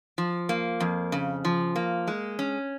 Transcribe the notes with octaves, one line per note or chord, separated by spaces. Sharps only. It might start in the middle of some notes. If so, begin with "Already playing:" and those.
F3
A#3
F2
C#3
F3
A#3
G#3
C#4